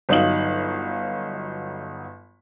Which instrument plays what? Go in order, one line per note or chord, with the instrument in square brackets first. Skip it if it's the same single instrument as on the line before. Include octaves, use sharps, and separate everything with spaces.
[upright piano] G1 F#3 D#4 F5 F#7